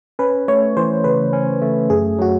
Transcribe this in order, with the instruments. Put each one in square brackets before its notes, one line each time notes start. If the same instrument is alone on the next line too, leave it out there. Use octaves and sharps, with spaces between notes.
[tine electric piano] C#4 [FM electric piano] B4
[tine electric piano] A3 [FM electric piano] C#5
[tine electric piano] E3 [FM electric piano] C5
[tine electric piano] C#3 [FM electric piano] B4
[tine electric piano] C#4
A3
[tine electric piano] F#2 [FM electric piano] G#4
[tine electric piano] F#3 [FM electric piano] F#4